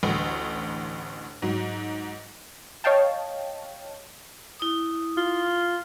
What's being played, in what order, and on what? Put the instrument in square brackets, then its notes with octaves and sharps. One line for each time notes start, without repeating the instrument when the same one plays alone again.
[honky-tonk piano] A1 D2
G#2 F#3
[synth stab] C#5 D#5 F5 G5 A5
[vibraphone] E4 D#6
[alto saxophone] F4